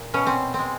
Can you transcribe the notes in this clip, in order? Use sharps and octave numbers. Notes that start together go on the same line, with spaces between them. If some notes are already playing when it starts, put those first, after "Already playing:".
Already playing: A#2
B2 C#4
C4
C4
G#3